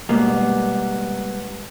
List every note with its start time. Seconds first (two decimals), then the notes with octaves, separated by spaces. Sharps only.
0.09 B2 G3 G#3 A#3 B3